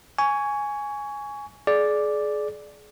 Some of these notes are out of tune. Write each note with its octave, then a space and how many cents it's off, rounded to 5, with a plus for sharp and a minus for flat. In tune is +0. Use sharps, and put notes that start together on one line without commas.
G#5 +0 C#6 +20
G#4 +30 D5 +0